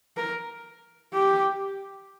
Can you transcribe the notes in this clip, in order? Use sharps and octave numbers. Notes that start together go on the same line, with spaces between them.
A#4
G4